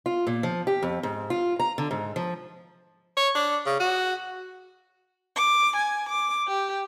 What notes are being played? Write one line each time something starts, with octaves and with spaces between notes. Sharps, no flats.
F4
A#2
F3
G4
F2
G#2
F4
A#5
D3
G#2
F3
C#5
D4
C#3
F#4
D6
G#5
D6
G4